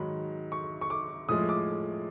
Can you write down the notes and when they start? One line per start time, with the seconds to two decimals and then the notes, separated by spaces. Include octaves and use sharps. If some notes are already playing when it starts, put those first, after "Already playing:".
Already playing: G#2 D#3 F#3 B5
0.52 C#6
0.81 C#6
0.90 D6
1.29 A2 F3 G#3 D#6
1.49 D6